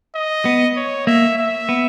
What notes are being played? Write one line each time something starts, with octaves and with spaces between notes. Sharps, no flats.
D#5
B3
C#5
A#3 E5
E5
B3